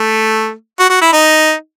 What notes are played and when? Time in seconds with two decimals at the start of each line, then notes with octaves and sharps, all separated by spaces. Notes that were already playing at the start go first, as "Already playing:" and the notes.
Already playing: A3
0.79 F#4
0.90 F#4
1.01 E4
1.13 D#4